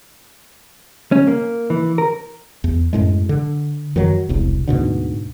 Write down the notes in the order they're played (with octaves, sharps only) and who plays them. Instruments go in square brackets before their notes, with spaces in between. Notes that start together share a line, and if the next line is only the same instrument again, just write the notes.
[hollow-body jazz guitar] C#4
A#3
E3
A#4
[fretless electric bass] E2
F#2 A2 G#3
D3
F#2 D#3 F#3
E1 C2
D2 G#2 B2 D3